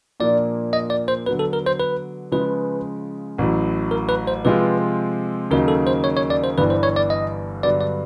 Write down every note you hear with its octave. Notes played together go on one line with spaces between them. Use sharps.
A#2 F3 A#3 D4 D5
D#5
D5
C5
D3 F#3 B3 B4
A4
A#4
C5
B4
C#3 F3 G#3 B4
A1 A2 F#3
A#4
B4
C5
C3 F3 G#3 C4 F4 B4
D#2 C#3 F#3 A#3 D#4 A#4
A4
C5
C#5
C#5
D5
C5
G1 G2 E3 G3 B3 B4
C5
C#5
D5
D#5
G2 D3 F#3 B3 D5
D5